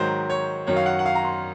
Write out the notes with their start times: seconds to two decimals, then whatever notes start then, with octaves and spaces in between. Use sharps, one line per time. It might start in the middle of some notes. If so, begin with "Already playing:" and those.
Already playing: G#2 D#3 F#3 C5
0.30 C#5
0.67 F#2 D#3 F#3 C#5
0.76 F5
0.86 F#5
0.99 F#5
1.06 F5
1.15 A#5
1.24 C6